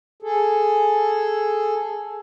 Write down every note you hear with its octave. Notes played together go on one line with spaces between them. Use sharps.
G#4 A4